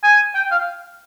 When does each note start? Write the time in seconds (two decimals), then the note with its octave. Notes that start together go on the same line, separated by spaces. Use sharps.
0.04 G#5
0.35 G5
0.51 F5